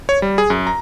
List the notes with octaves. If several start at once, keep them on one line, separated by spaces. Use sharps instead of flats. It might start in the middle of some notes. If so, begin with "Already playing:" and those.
C#5
G3
G#4
F#2
A#5